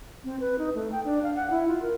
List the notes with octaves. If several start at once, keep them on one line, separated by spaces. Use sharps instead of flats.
C4
B4
D#4
A3
G5
D4
F5
F#5
E4
F4
A#4